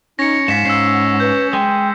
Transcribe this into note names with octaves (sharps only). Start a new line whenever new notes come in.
C#4 D#4 A#6 C#7
G#2 F5 B6 E7
G#2 C#4 E6 C7
F#5
B4 G6
G#3 G5